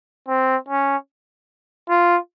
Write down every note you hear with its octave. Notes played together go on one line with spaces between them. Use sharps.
C4
C#4
F4